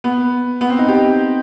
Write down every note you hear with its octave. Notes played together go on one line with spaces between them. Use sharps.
B3
B3
C4
D#4
G4